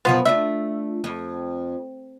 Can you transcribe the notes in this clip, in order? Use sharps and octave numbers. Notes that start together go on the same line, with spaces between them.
F#2 B2 F3 B3 F4
A3 D4 F4 E5
F2